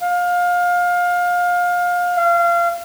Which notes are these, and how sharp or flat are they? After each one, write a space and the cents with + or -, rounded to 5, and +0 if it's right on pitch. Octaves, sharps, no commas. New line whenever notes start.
F5 +25
F5 -25